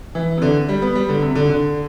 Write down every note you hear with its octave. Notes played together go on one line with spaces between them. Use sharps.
E3
C3
D3
G3
B3
G3
D3
C3
D3
D3